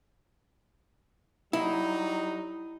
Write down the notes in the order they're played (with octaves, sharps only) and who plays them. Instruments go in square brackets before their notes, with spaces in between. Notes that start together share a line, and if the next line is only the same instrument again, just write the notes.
[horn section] F#3 G3 D#4 [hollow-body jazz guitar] E4